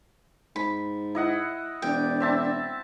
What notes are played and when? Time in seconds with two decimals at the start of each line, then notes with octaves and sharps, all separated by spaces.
0.56 G#2 B5
1.15 E4 D#5 F#5
1.82 E1 D4 G5
2.20 C4 E5 A5